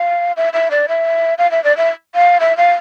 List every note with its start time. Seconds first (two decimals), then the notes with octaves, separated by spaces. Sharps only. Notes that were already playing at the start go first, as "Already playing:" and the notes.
Already playing: F5
0.37 E5
0.53 E5
0.71 D5
0.88 E5
1.38 F5
1.51 E5
1.64 D5
1.77 E5
2.15 F5
2.40 E5
2.57 F5